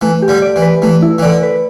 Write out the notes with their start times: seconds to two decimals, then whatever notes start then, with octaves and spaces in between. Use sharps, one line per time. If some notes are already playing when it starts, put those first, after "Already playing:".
0.01 E3 A3
0.22 G4
0.28 D3 G3
0.42 D5
0.56 E3
0.62 B4
0.82 E3 A3
1.02 E4
1.18 E3
1.22 D3 D5
1.43 B4